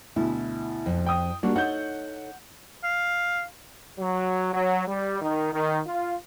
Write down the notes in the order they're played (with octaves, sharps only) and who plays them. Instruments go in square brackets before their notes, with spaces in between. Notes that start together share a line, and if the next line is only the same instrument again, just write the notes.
[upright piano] D2 B2 [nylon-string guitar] E4
[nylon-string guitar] F2
[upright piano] G5 D#6
[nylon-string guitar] G3 A#3 [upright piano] D4 F#4
[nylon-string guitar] D#4 A4 C#5 [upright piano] F#5 G6
[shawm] F5
[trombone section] F#3
F#3
G3
D#3
D#3
F4